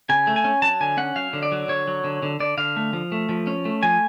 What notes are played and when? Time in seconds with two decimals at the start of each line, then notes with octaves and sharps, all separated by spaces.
0.09 C#3 G#5
0.27 A3
0.36 G#5
0.44 C#4
0.62 F#3 A5
0.80 D3 G#5
0.97 C#4 F#5
1.16 F#3 F5
1.33 D3
1.43 D5
1.52 F#3
1.68 D3 C#5
1.88 F#3
2.04 D3
2.23 D3
2.40 D3 D5
2.57 D3 F5
2.76 A3
2.93 F3
3.12 A3
3.29 F3
3.47 C#4
3.65 A3
3.83 F3 G#5